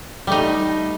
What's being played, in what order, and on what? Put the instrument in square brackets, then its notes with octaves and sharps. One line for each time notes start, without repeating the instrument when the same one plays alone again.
[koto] G3 A3 D#4